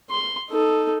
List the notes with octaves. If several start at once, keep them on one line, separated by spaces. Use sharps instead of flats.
C6
D#4 A4